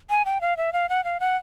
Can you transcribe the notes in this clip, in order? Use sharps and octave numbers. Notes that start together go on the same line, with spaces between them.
G#5
G5
F5
E5
F5
F#5
F5
F#5